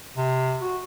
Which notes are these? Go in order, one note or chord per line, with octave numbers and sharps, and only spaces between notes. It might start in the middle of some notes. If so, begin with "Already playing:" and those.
C3
F#4